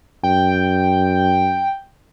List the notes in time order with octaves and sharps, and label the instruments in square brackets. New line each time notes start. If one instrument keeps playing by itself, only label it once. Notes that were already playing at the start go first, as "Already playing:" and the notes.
[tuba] F#2 [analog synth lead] G5